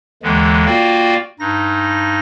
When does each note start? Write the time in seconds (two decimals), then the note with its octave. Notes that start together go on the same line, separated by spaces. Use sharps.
0.23 D#2 D3 E3 G#3
0.66 A#3 F4 F#4 D5 F5 G5
1.40 G2 D#4 A#6